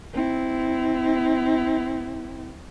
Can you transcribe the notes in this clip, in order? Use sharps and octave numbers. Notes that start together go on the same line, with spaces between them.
C4 E4